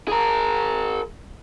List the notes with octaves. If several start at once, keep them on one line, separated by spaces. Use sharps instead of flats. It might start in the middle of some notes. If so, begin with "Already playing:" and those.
G#4 A#4